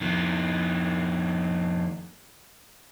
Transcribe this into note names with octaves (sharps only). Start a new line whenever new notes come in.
F2 D#3